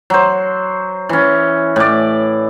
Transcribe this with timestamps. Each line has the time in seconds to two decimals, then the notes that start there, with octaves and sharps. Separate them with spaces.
0.10 F#3 C5
1.09 E3 C#4
1.76 A2 D5